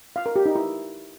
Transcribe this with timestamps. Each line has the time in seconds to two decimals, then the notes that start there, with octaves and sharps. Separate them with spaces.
0.16 F5
0.26 A#4
0.36 G4
0.46 D#4
0.55 E4